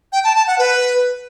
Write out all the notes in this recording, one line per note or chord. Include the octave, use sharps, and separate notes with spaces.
G5
A5
A5
F#5
B4